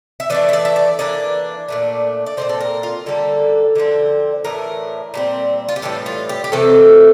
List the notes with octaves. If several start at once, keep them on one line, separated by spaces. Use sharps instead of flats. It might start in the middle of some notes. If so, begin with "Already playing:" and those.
E5
E3 A3 D4 D5
E5
D5
E5
D5
E3 A#3 D4 D5
A#2 A3 D4
D5
A#2 G3 C4 C5
A4
A#4
F4
D3 G3 A#3 A4
D3 F3 C4
A2 E3 A3 D4 A#4
A#2 G3 C4
F4
G4
A2 E3 G3 A4
F4
G4
G4
C3 E3 A3 C4 A4